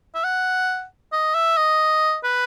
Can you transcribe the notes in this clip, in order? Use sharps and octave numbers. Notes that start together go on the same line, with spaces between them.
E5
F#5
D#5
E5
D#5
B4